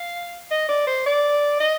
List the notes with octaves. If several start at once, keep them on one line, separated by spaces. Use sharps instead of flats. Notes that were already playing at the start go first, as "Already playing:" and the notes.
Already playing: F5
D#5
D5
C5
D5
D#5